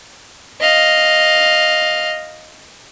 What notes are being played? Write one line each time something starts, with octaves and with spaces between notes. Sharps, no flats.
D#5 F5